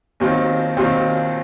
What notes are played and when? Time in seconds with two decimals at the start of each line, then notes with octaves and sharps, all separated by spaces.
0.20 D#2 D#3 F#3 C4 F4
0.77 D#2 D#3 F#3 C4 F4